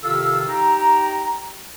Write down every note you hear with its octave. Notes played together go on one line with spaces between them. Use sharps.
C3 D#3 F4 A4 F5 E6
D#4 G4 G5 A#5